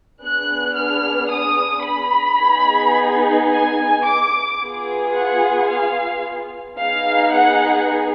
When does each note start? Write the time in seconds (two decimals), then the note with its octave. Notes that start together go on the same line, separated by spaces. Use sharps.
0.23 B3 D4 G#4 F#6
0.77 F6
1.31 D#6
1.86 B5
2.41 B3 D#4 G#4
3.51 G#5
4.05 D6
4.61 B3 F4 G#4
5.15 F#5
5.69 F5
6.79 B3 D#4 G#4 F5
7.35 F#5